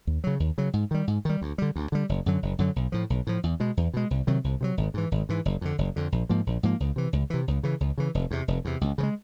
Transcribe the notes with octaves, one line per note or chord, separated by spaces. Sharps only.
D#2
C#3 F#3
D#2
C#3 F#3
G#2
D#3 G3
G#2
D#3 G3
D2
D3 G3
D2
D3 G3
F#1
F#2 D3 F#3
F#1
F#2 D3 F#3
B1
A2 F3
B1
A2 F3
E2
B2 G#3
E2
B2 G#3
C2
C3 D#3 F#3
C2
C3 D#3 F#3
G#1
G#2 E3
G#1
G#2 E3
F#1
F2 D3
F#1
F2 D3
A#1
G#2 F3 A#3
A#1
G#2 F3 A#3
C#2
C3 E3
C#2
C3 E3
C#2
C#3 E3
C#2
C#3 E3
F1
E2 C3
F1
E2 C3
C#2
C#3 F3
G#3